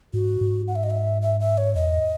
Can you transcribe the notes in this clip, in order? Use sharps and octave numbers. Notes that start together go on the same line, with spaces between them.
G#2 F#4
G#2
F#5
E5
D#5
E5
E5
E5
C#5
E2 D#5